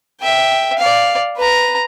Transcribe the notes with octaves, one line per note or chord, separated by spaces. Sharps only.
E5 G5
D5 F5
B4 A#5